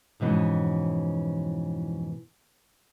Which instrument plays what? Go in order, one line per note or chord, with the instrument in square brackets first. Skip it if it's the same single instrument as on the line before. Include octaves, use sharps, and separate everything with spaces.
[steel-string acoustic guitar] F2 G#2 B2 E3 C#4